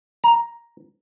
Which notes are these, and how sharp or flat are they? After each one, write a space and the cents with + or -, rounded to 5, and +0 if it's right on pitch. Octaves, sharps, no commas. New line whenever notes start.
A#5 +5